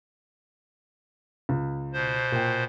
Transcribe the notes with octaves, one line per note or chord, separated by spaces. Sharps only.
C#2
B2 C5
A#2 G5